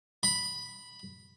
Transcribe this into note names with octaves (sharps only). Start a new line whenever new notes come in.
B5